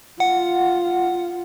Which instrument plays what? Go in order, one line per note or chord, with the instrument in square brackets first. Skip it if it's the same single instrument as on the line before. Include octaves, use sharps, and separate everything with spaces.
[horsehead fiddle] F4 [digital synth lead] F#5